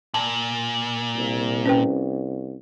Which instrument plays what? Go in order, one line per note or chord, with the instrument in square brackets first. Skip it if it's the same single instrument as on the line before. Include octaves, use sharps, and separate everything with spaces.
[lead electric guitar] A#2 [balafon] A5
[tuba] C2
[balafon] C#4 B4 G5